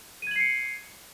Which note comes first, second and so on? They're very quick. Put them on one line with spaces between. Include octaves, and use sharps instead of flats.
D#7 G#6 F#7 C7 C#7